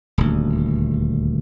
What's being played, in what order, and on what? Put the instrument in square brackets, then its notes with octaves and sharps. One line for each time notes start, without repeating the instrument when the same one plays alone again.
[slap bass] D#1 D2